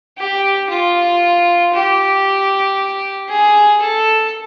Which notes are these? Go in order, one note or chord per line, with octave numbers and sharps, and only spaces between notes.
G4
F4
G4
G#4
A4